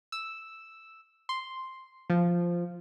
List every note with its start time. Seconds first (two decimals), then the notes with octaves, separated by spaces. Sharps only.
0.12 E6
1.29 C6
2.10 F3